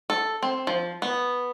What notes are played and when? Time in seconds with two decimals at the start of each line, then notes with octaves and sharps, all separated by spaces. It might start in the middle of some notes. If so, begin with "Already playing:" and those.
0.10 A4
0.43 C4
0.67 F3
1.02 B3